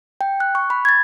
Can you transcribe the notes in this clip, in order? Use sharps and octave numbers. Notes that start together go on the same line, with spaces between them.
G5
F#6
C#6
B5
G#6 A6